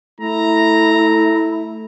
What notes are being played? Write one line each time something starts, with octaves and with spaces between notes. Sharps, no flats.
A3 E4 A#5